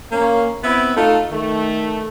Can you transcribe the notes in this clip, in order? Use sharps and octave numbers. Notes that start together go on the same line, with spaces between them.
A#3 C#4
B3 C4 E4
A3 D#4 F4 A4
D#3 A3